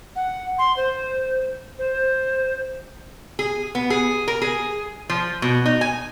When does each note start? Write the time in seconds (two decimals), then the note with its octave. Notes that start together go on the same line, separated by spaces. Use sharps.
0.16 F#5
0.58 C6
0.77 C5
1.79 C5
3.39 G#4
3.75 B3
3.90 G#4
4.28 A#4
4.42 G#4
5.10 F3
5.42 B2
5.66 D#4
5.81 G#5